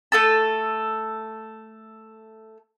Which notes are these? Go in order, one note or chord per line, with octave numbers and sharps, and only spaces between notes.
A3 A4 A5